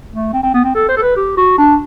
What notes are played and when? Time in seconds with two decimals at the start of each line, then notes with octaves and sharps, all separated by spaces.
0.12 A3
0.33 C4
0.43 C4
0.54 B3
0.64 C4
0.75 A4
0.89 C5
0.97 A4
1.02 B4
1.16 G4
1.37 F#4
1.58 D4